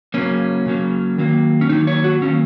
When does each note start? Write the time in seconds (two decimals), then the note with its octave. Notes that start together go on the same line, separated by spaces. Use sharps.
0.14 C#3 F#3 A#3 C#4
0.66 C#3 F#3 A#3
1.18 D#3 F#3 A#3
1.61 C#4
1.69 D#3 F#3 A#3 D#4
1.87 C#5
2.04 F#4
2.21 D#3 F#3 A#3 C#4